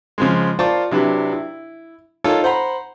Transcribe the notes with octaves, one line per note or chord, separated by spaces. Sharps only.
C#3 F3 G#3
F4 A#4 C5 D5 A5 C#6
C3 F#3 D4 E4 B4
E4
D#4 F4 A4 A#4 C#5
C5 F#5 A#5 B5